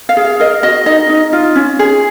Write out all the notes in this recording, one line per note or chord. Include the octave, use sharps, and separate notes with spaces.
F5
G#4
F5
A#4 D#5
F#4 D#5
D#4 D#5
D#4
F4
C#4
G#4